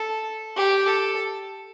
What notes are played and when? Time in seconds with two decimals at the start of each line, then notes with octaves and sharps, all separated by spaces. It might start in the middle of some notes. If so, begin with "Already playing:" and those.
Already playing: A4
0.56 G4
0.86 A4